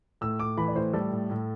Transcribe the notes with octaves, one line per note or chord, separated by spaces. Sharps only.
A2 E6
A2 D6
E3 B5
D5
A2 C5
G3 A4
A2
A2